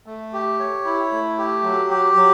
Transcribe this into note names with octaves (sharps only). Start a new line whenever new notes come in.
A3
G4
C#5
E4
A3
G4
F#3
G4
F#3